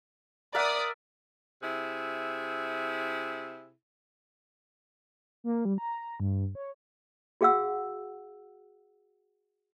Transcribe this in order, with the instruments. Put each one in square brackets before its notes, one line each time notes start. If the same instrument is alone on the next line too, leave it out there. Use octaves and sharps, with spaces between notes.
[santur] A#4 E5 F#5 [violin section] D5 D#6
[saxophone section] C3 E4 G#4
[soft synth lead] A#3
G3
A#5
G2
C#5
[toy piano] F#4 G#4 F5 F#5 E6